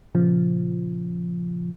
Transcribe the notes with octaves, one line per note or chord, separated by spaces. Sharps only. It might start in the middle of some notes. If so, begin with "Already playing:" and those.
A#2 C#3 F3